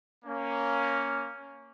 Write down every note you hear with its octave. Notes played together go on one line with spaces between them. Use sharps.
A#3 C#4